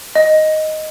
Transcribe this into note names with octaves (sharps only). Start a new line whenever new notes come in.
D#5